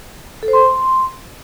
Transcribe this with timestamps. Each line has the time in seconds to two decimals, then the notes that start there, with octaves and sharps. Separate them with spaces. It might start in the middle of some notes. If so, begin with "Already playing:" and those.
0.43 A4
0.48 C5
0.53 C6